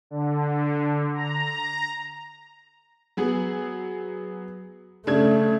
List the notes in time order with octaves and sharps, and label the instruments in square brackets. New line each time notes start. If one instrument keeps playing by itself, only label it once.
[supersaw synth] D3
A#5
[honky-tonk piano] F#3 B3 G#4
[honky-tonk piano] C#3 D4 G#6 [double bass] A3